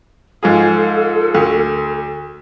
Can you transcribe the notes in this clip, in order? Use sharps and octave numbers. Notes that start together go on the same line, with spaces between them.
G#2 F3 G#4 A4
D2